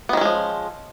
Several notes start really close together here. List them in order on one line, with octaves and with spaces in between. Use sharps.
B3 D#3 C#4 G#3 F3